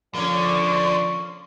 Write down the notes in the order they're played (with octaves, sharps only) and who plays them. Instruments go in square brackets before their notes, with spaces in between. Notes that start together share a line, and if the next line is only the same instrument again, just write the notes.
[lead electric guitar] D3 [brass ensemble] F3 A4 D5 [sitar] A#3 C#4